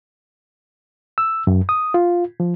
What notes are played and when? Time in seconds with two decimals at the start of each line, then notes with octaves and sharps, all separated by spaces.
1.18 E6
1.47 F#2
1.69 D#6
1.94 F4
2.40 F3